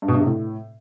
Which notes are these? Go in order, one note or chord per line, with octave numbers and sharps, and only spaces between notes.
G2
B2
G2
C3
A2